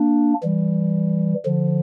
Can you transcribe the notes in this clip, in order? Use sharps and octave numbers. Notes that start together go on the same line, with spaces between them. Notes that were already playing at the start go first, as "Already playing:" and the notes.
Already playing: A#3 D4
E3 G3
D3 F3